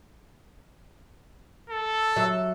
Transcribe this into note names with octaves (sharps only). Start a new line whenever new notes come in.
A4
F#3 E5